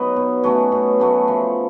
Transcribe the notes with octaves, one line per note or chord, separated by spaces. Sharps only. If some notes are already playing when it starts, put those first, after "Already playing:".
Already playing: F#3 B3 D#4
B2
F#3 A3 C#4
B2
F#3 A3 C#4
F3